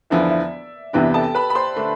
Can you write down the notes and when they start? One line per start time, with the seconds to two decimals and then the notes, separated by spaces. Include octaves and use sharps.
0.10 E2 D3 F3 B3 E4 E5
0.21 D5
0.30 E5
0.93 E2 C3 E3 B3 D4 G4 G5
1.14 A4 A5
1.35 B4 B5
1.50 B5
1.55 C5 C6
1.76 D3 A3 D4